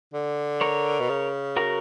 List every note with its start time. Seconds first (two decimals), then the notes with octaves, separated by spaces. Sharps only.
0.14 D3
0.61 A#4 C#5
1.00 B2
1.09 C#3
1.57 F#4 A#4